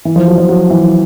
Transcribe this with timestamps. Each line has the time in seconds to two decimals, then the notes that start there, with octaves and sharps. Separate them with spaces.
0.05 E3
0.16 F3
0.28 F#3
0.38 F3
0.49 F#3
0.70 E3